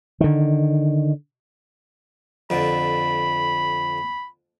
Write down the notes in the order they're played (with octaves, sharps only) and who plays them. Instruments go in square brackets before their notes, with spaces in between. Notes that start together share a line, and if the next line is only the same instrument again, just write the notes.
[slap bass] D3 D#3
[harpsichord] F2 D3 [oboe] B5